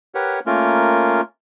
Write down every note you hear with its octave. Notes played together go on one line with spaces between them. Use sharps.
G4 A#4 B4 C#5 F#5
A3 A#3 C#4 F4 A#4